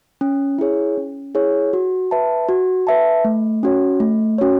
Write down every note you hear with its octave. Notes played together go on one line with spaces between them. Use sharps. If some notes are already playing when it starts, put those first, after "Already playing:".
C#4
E4 G#4 C#5
C#4
E4 G#4 C#5
F#4
B4 E5 A5
F#4
B4 E5 A5
A3
C#4 F#4 C#5
A3
C#4 F#4 C#5